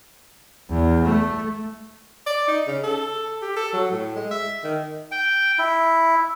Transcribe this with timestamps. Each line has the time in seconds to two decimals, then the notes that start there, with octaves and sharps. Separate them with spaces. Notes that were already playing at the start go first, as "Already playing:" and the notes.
0.69 E2
1.04 A3
2.27 D5
2.48 D#4
2.67 C#3
2.84 A4
3.42 G4
3.57 A4
3.73 F#3
3.91 A2
4.16 G#3
4.31 E5
4.64 D#3
5.11 G5
5.59 E4